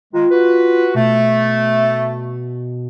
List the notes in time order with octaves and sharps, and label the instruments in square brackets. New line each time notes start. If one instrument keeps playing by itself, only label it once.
[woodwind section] D#3 G#3 [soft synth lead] F4
[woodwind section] F#4 B4
[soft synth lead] B2 [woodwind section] A3